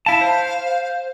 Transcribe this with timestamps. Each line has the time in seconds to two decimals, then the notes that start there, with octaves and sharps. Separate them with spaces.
0.06 E4 F5 A5
0.21 C5